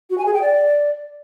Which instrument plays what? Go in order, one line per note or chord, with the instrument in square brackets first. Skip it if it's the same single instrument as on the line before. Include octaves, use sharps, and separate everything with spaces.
[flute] F#4
G#5
G#4
G5
D5